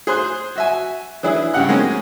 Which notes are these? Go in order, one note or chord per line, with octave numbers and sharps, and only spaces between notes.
G#4 C5 C6 F#6
F#4 E5 G#5
E3 D4 E4 G#4
G2 C#3 G4 F#5 F#6
G#3 A#3 C4 C#4